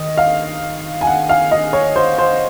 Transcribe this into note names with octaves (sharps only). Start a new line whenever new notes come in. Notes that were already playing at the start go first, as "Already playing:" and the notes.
Already playing: D#3 D#5
F5
G#5
F#5
F5
D#5
C#5
C5
C5